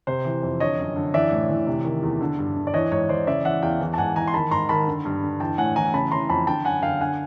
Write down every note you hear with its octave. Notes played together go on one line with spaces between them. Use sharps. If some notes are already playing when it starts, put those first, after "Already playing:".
C3 C5
E3
F2
D3 C#5 D#5
F#2
D3
E3 D5 E5
A2
E3
C3
D#3
E2
D3
G2
D3
D5
E3 C#5 D#5
G#2 C#5
E3 C5 D5
C#3 D5 E5
E3 E5 F#5
E2 F5 G5
E3
A5
G#2 F#5 G#5
E3 G#5 A#5
C6
D#3 A5 B5
G#2 A#5 C6
D#3 A5 B5
D3
G2
D3
E3 G5 A5
A2 F#5 G#5
E3 G#5 A#5
C#3 A5 B5
E3 A#5 C6
F2 A5 B5
D3 G5 A5
F#2 F#5 G#5
D3 F5 G5
D3 F#5 G#5